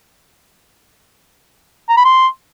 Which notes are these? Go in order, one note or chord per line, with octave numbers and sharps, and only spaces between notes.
A#5
B5
C6